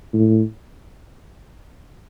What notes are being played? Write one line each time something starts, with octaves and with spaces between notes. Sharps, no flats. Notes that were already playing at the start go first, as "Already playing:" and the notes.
A2